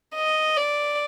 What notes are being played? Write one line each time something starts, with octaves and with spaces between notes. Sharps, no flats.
D#5
D5